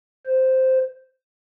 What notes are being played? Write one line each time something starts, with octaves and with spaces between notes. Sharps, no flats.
C5